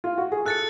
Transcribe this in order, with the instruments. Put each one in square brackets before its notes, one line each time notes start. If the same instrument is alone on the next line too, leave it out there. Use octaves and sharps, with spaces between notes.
[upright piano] F4
F#4
G#4
[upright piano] A4 [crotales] F#6 A6 C#7